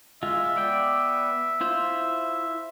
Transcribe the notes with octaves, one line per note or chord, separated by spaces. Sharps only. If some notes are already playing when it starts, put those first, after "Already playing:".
G#3 F4 E5
B3 D5 G5
E4 F4 C5